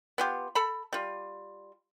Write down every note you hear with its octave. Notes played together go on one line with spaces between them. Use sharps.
B3 F4 G4
A4 B5
G3 F4